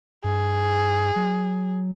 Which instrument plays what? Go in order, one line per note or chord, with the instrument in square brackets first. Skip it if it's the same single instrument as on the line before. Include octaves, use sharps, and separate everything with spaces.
[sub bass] G2 [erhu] G#4
[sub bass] F#3